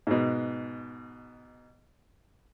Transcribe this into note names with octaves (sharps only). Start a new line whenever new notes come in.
G#2 B2